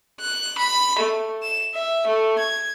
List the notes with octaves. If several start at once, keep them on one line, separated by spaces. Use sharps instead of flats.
F#6
B5
A3
E7
E5
A3
G#6